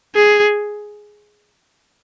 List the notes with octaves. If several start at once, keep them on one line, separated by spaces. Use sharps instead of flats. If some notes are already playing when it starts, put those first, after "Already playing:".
G#4